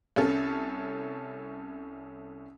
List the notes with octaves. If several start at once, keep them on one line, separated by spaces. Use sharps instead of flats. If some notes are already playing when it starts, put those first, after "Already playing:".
C2 C#4 A4